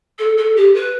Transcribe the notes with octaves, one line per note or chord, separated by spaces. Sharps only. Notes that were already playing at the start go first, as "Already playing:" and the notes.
A4
A4
G4
B4